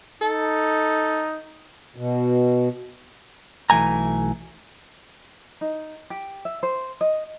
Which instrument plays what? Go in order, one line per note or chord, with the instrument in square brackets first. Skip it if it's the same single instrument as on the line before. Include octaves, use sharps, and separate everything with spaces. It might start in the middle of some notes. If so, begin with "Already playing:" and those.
[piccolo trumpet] D#4 [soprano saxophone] A4
[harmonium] B2
[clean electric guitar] B1 E3 A3 G#5 A#5
[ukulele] D#4
G4
E5
C5
D#5